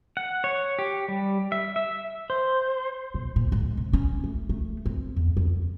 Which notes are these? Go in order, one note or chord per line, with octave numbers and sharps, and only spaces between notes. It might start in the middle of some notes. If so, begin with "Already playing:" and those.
F#5
C#5
G4
G3
E5
E5
C5
B2
A#2
G#2
C3
C#4
A3
A3
C4
E2
F2